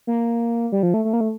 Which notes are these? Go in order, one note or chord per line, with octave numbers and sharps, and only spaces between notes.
A#3
G3
F3
A3
A3
A#3
A3